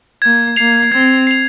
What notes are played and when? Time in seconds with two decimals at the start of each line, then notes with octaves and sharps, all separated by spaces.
0.22 A#3 G#6
0.56 A#3 C7 F7
0.92 C4 G#6
1.27 C7 F7